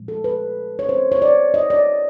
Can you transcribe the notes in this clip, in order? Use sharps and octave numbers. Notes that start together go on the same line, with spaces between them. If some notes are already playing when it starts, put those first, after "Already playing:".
Already playing: A#2 F3 G#3
A4
B4
C#5
C5
C#5
D5
D#5
D5